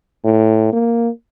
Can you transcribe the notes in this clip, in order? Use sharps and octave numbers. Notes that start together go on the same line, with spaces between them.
A2
A#3